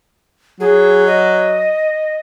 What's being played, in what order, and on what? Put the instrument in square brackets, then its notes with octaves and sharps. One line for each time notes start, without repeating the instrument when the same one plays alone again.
[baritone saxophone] F#3 [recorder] G#4
[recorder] D#5